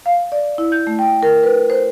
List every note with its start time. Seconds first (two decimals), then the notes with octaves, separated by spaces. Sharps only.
0.06 F5
0.32 D5
0.58 E4
0.72 G6
0.87 A3
0.99 G5
1.23 A#4
1.43 B4
1.70 C5